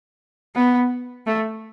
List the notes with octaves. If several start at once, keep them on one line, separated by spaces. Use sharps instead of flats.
B3
A3